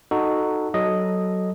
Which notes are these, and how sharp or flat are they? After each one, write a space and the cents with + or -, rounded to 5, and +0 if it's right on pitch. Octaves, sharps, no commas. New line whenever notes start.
D#4 -15 F#4 +0 A4 +0
F#3 +15 A4 +0 D#5 +0